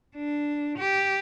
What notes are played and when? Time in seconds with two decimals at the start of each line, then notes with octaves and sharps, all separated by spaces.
0.16 D4
0.78 G4